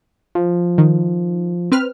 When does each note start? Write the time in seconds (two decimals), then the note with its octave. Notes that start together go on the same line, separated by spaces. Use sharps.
0.35 F3
0.78 D#3
1.72 C4 B4 F6